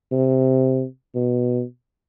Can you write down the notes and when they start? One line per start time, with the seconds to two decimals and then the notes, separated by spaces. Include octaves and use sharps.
0.12 C3
1.15 B2